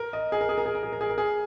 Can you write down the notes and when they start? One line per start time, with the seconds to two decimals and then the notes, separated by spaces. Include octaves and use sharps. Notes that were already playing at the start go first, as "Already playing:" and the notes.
Already playing: A#4
0.13 D#5
0.32 G#4
0.41 A#4
0.49 G#4
0.58 A#4
0.66 G#4
0.75 A#4
0.83 G#4
0.93 A#4
1.01 G#4
1.09 A#4
1.18 G#4